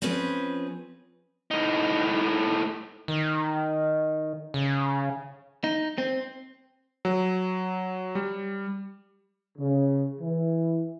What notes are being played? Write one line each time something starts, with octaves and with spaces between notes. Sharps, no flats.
F3 C4 C#4 G#4 B4
A2 D#4
D#3
C#3
D#4
C4
F#3
G3
C#3
E3